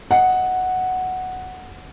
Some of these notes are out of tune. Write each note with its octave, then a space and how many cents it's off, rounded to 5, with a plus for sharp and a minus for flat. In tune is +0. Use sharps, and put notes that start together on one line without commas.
D#5 +5 F#5 +0